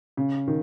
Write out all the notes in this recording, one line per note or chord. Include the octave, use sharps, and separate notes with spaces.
C#3
D#3